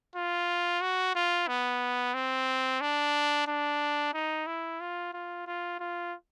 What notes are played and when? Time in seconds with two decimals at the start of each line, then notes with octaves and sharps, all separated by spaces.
0.15 F4
0.81 F#4
1.15 F4
1.48 B3
2.14 C4
2.81 D4
3.47 D4
4.14 D#4
4.47 E4
4.81 F4
5.13 F4
5.47 F4
5.80 F4